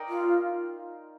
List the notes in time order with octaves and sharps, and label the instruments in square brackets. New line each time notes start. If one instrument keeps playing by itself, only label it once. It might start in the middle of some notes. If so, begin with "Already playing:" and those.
Already playing: [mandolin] D#4 A#4 D5 G5
[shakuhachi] F4